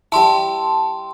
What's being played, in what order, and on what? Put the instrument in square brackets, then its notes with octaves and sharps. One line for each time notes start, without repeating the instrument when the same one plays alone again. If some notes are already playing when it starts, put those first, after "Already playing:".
[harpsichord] G3 E4 [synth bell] A5 C6